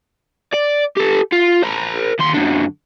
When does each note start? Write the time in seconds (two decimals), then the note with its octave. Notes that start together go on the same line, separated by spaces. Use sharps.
0.54 D5
0.97 G4 A4
1.33 F4
1.63 A#4 C5
2.20 D#2 C6
2.34 F#2 D3